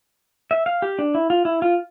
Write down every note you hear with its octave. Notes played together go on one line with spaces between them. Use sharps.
E5
F5
G4
D4
E4
F4
E4
F4